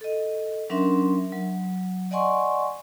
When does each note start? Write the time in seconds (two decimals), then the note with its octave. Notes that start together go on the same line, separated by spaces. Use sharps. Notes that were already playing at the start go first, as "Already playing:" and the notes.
0.01 A4 D#5
0.70 F#3 C#4 D4 A#4 E5 C6
1.32 F#3
2.11 D5 D#5 F#5 G#5 C6 C#6